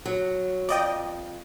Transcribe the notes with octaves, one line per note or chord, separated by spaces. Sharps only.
F#3
F2 D5 D#5 G5